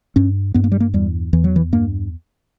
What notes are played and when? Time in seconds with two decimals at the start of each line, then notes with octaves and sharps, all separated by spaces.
0.16 G2 C#4
0.54 G2 B3
0.64 A#3
0.72 G3
0.80 A#3
0.94 E2 G3
1.33 E2 E3
1.44 F#3
1.56 E3
1.72 G2 A#3